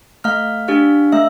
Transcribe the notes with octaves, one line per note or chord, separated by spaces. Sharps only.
A3 F5 F6
D4 G4 F5 F6
A3 E5 E6